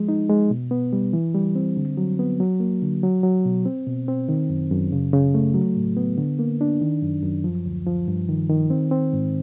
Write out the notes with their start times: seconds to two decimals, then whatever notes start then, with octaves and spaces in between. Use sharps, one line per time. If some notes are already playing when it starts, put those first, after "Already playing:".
Already playing: F3 G#3
0.08 D#4
0.30 G#3
0.50 B2
0.71 B3
0.93 G3
1.13 E3
1.34 G3
1.55 C4
1.77 D3
1.97 F#3
2.19 B3
2.40 F#3
2.60 A#3
2.82 D3
3.03 F#3
3.23 F#3
3.45 B2
3.66 C4
3.86 B2
4.08 C4
4.29 D#3
4.49 F#2
4.71 F#2
4.92 C#3
5.13 C#3
5.34 A3
5.54 F#3
5.76 A2
5.97 B3
6.18 D3
6.39 A#3
6.61 D4
6.81 D#3
7.02 F#2
7.23 F#2
7.44 F3
7.65 D2
7.87 F3
8.08 G2
8.29 D#3
8.49 D#3
8.70 C4
8.91 C4
9.13 G#2